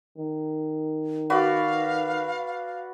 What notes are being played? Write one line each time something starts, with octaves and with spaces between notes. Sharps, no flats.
D#3
F#4 B4 D5 F5